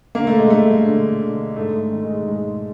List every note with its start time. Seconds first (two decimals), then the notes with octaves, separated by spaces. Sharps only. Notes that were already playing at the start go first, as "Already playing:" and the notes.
0.15 D3 A#3
0.27 A3
0.39 G#3
0.50 G2 A3
0.86 D3
1.21 D3
1.56 G#2 A3
1.92 D#3
2.04 G#3
2.27 G#2 G#3